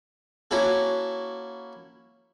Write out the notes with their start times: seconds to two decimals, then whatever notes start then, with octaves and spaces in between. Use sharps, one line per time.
0.51 A#3 C#4 E4 F#4 A4